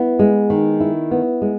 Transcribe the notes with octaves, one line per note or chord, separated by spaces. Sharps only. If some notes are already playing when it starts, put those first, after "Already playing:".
Already playing: B3 E4
G#3
D#3
E4
B3
G#3